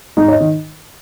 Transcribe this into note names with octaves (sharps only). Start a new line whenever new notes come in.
G#2 D#4
C#5
D#5
D#3